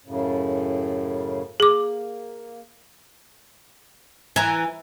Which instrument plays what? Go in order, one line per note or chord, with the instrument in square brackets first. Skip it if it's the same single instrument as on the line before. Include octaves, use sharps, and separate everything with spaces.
[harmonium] F#2 A2 C#3
[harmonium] A#3 [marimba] G#4 D6
[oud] E3 [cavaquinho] G#5 A#5